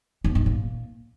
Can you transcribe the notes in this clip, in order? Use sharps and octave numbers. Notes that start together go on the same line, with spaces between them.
E2
G#2
A#2